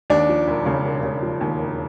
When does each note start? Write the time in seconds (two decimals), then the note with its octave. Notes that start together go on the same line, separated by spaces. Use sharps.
0.10 D#2 D4 D5
0.29 F3
0.48 E1
0.66 C#3
0.85 E1
1.03 C#3
1.22 F3
1.41 D#2
1.59 E1